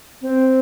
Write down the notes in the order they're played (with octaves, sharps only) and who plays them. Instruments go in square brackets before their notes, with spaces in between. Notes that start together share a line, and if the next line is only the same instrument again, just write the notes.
[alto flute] C4